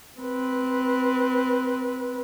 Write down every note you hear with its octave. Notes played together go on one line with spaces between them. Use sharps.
C4 B4